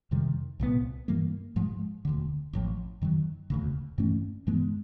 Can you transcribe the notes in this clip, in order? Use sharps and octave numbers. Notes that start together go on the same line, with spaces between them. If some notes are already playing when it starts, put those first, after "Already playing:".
F2 C3 D#3 G3
C2 A#2 F#3 B3
G2 E3 G3 A#3
G#2 F3 G#3
E1 D2 D3
A1 A2 F3
F#2 D#3 F#3
E1 D2 C#3
G2 E3 A3 C#4
G2 E3 G#3 B3